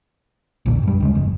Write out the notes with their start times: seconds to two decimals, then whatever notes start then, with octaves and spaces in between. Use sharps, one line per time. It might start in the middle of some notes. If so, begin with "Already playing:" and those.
0.66 A#1 E2 A#2 D3
0.83 F#2 G3
1.00 D2 C#3 G#3
1.15 G1 F2